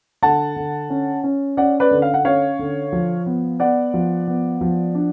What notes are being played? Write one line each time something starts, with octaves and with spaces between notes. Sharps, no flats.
D3 F#5 A5
D3
C#4
C#4
C#4 D5 F#5
B4 D5
D3
F5
F#5
C#4 C#5 F5
D3
F3
B3
B3 D5 F#5
F3
B3
F3
D4